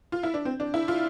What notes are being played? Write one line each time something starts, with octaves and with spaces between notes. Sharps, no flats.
F4
E4
D4
C4
D4
E4
F4